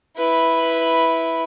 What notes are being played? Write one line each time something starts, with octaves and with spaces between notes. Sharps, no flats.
E4 B4